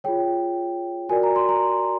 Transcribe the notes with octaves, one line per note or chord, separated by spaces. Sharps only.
F4 G#4 C#5 G5
F#4 A#4 D5 G#5
A#5
C6
A#5